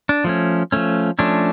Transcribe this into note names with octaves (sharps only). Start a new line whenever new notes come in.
D4
F3 A3 C#4
F3 A3 C#4
F3 A3 C#4 D4